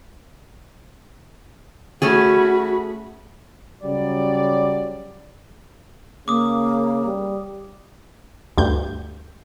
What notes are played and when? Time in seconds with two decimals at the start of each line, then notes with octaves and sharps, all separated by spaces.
2.02 A3 C#4 F#4 G#4 B5
3.82 C#3 F#3 G3 D5
6.28 C#3 A#3 D6 D#6
7.05 G3
8.58 D2 G2 G6